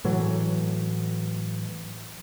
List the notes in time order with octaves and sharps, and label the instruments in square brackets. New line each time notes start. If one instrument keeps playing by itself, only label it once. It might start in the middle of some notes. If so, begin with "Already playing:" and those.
[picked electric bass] A2 E3 F#3